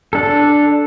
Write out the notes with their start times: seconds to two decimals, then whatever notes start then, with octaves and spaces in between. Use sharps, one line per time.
0.13 D4 A4